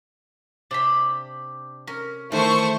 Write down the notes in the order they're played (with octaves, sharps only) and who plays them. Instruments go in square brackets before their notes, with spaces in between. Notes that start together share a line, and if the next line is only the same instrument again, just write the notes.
[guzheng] C3 [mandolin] D4 G4 B5
[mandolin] C#4 [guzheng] A#4
[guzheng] D#3 E3 A#3 [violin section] A3 C5 C#6